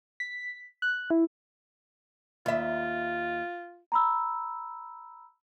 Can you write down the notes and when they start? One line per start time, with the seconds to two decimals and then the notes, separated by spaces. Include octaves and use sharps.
0.20 B6
0.82 F#6
1.10 E4
2.46 D#2 F4 E5
3.92 A#5 B5 E6